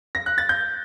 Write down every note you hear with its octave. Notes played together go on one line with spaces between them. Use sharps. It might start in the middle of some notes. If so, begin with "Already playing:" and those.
A#6
F#6
A6
G6